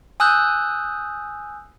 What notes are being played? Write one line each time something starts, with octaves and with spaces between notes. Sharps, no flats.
G#5 D#6 E6 F#6 G6